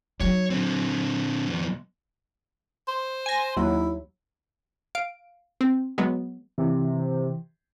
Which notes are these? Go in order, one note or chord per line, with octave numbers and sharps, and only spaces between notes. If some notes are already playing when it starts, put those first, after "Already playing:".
F#3 D#4 C#5
D3 C4
F2 B3
C5
G#5 A#6
D#2 F#3 E4
F5 D7
C4
F#3 G#3 B3
C3 E3